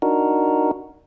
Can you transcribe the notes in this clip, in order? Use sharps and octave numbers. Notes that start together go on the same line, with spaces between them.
D4 D#4 F#4 A#4